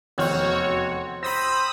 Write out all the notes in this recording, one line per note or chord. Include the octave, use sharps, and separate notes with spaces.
F1 E2 C4 F#4 C#5 C#6 F6
C5 B5 D#6 E6 A#6